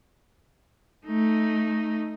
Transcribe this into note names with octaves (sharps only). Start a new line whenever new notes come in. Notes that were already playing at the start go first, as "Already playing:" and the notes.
A3 D#4